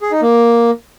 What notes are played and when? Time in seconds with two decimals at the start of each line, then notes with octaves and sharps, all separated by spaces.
0.01 G#4
0.12 D#4
0.22 A#3